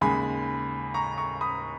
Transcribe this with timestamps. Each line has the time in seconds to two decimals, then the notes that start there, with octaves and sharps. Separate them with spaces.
0.01 D#2 C#3 G#3 G#5 B5
0.94 A#5 C#6
1.17 A#5 C#6
1.41 B5 D#6